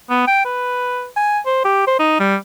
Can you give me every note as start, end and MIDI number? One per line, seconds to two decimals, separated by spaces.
0.10 0.26 59
0.28 0.45 79
0.45 1.07 71
1.16 1.39 80
1.46 1.63 72
1.64 1.86 67
1.87 1.95 72
2.00 2.16 63
2.20 2.36 55